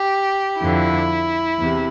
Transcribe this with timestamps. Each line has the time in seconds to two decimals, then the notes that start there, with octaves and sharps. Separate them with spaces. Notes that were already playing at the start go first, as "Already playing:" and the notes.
Already playing: G4
0.60 F2 D3 E4
1.57 E2 C3